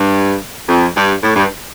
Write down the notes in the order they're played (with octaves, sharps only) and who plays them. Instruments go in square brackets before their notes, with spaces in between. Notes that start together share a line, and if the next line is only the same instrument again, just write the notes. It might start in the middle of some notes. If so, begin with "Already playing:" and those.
Already playing: [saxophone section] G2
F2
G2
A2
G2